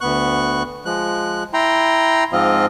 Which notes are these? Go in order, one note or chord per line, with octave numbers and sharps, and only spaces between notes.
D2 B3 C#6 F#6
F3 G#3 F#6
E4 G5 A#5 C6
G#2 F3 C4 F4 D#5